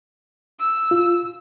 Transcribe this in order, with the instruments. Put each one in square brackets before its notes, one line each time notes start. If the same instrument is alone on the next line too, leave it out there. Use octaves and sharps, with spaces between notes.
[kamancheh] E6
[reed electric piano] F4